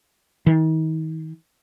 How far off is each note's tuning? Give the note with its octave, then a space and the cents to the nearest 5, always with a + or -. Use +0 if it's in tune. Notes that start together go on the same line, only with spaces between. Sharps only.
D#3 +40